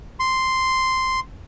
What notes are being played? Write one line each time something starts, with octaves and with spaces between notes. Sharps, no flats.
C6